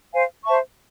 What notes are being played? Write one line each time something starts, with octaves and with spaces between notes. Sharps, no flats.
C5 F5 G#5
C5 E5 A5 C#6